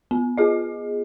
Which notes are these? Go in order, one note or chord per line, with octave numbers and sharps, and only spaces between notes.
B3
F4 G#4 D#5